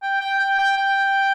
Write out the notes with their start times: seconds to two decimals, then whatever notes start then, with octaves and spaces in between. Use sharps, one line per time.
0.02 G5
0.20 G5
0.39 G5
0.58 G5
0.77 G5